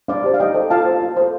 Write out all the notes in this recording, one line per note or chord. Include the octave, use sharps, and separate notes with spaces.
D4 D5 F5
G4 C5
F5
D#4 D#5 G5
A4 C5
F4 F5 A5
C5
F4
A4 C5